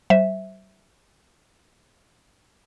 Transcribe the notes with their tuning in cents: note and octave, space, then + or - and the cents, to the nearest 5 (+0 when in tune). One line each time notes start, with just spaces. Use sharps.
G3 -45 C5 +0 E5 -5